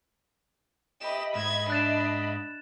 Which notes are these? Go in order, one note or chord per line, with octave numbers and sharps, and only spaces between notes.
G4 D#5 E5 B5 E7
G#2 G#6 E7
D4 F#6 A6 E7